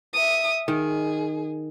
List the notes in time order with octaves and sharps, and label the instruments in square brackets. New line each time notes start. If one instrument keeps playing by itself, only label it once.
[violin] E5 D#6
[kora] D#3 [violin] G#4